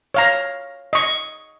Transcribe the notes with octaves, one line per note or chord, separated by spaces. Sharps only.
C#5 F5 A#5
D#5 C#6